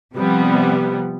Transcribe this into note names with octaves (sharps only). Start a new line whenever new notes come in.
C3 F3 G3 B3